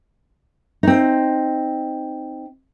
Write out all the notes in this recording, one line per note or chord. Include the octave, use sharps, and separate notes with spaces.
C4 D#4